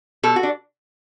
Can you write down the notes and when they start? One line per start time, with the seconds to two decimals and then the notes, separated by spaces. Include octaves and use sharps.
0.23 B2 A4
0.36 F#4
0.43 D4